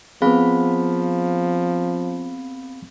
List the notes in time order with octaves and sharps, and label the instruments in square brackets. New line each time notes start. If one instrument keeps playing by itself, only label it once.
[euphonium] F3 [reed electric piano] B3 G#4 [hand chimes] C4 F5 B5